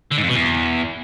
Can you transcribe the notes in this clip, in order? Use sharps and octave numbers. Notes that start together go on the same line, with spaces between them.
D3
G#2
F2
B2
E2